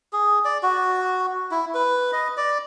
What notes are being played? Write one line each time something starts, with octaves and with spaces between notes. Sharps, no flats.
G#4
D5
F#4
E4
B4
D#5
D5